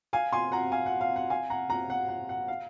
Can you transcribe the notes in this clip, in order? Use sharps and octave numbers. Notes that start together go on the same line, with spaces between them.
F5 G#5
G#5 C6
F#5 A#5
F5 G#5
F#5
F5
F#5
F5 G#5
F#5 A#5
F#5 A#5
F#5
F#5
F#5
F5